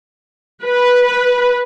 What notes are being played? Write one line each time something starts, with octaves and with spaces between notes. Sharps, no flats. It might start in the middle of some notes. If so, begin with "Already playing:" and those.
B4